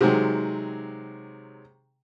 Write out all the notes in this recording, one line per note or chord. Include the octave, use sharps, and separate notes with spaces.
C3 D#3 F#3 G#3